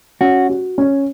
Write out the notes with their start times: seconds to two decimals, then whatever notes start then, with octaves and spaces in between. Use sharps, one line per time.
0.21 C#4 F#4
0.50 F#4
0.78 C#4